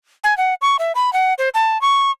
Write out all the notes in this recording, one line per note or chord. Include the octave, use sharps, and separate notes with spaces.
G#5
F#5
C#6
E5
B5
F#5
C5
A5
C#6